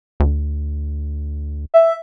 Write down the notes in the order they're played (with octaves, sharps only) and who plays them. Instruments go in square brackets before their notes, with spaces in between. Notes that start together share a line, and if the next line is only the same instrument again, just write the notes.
[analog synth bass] D2
[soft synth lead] E5